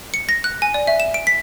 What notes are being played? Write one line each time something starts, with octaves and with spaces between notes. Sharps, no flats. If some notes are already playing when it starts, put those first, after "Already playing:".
C#7
A#6
F#6
G#5
D5
E5
E7
D7
B6